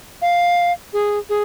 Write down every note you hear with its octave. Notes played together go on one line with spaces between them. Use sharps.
F5
G#4
G#4